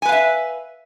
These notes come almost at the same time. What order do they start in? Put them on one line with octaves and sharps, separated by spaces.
G#5 B4 F5 E5